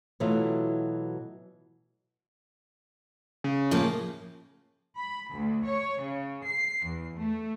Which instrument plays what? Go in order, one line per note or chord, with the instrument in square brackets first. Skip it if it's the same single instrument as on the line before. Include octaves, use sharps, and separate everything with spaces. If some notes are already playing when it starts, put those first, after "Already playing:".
[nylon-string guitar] B2 E3 F#3 A3 E4 F4
[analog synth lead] C#3
[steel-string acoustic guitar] A2 F3 A#3
[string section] B5
D2
C#5
C#3
C7
E2
A3